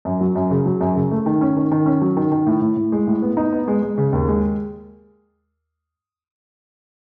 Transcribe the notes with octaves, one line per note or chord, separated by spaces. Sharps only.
F#2
F#3
F#2
C#3
F#3
F#2
C#3
A3
D#3
C#4
D#3
D#3
C#4
F#3
D#3
D#3
A2
A2
A2
G#3
A2
B3
D#4
B3
G#3
G#3
C#3
D#2
G#3